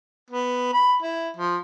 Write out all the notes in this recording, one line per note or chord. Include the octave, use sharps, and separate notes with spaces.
B3
B5
E4
F3